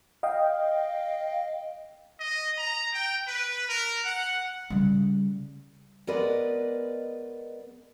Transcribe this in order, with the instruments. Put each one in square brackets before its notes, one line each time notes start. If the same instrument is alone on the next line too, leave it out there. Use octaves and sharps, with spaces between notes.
[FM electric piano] D#5 F5 G5
[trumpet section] D#5
A#5
G5
B4
A#4
F#5
[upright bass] C#3 G3
[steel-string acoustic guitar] G#3 B3 A#4 B4 D5 D#5